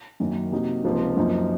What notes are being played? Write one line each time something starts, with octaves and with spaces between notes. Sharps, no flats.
F#2 D#3 A#3 C#4
C3 F#3 A#3 D#4
C#2 C3 F3 A#3 D#4
F#2 F3 A#3 D#4